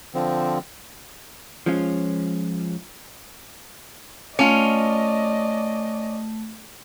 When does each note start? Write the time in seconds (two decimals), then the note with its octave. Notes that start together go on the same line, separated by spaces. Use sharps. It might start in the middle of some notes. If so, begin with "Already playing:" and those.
0.15 D3 F3 C4
1.66 F3 G#3 C#4 F4
4.39 A3 C#4 F4 D5 D#5